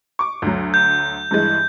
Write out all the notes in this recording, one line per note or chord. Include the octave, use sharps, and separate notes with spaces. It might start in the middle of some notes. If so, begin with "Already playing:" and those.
C#6 D6
D2 F#3
G6
G2 E3 G#3